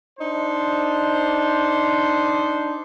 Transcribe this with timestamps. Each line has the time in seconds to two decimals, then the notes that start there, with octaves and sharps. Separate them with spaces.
0.19 D4 D#4 C5